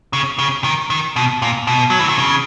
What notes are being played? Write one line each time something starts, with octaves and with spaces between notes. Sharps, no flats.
C#3
C#3
D#3
D#3
B2
A#2
B2
F#3
E3
D#3
C#3